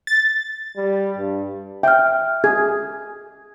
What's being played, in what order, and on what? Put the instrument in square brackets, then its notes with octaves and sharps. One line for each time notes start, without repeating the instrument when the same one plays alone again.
[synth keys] A6
[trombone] G3
G2
[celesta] E5 F6 [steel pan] G5
[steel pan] G#4 [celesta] G#6